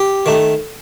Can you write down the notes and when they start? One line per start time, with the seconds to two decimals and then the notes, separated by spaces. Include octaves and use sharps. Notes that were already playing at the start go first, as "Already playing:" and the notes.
Already playing: G4
0.26 D#3 A3